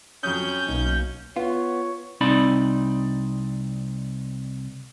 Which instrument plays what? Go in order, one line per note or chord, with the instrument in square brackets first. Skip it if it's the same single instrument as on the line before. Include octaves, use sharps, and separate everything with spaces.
[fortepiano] F2 F#3 D#6 [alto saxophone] C#4 [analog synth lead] G6
[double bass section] B1 A#3 [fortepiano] D#4
[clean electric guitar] B3 [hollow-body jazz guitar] F4 [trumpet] C#5
[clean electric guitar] C2 C4 D#4 D5 B5